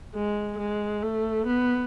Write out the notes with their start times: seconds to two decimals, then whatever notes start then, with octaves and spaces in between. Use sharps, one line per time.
0.14 G#3
0.58 G#3
1.02 A3
1.46 B3